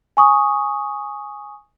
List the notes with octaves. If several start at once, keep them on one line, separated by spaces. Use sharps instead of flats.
G#5 C#6 D#6